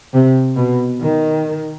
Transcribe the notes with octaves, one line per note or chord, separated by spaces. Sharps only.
C3
B2
D#3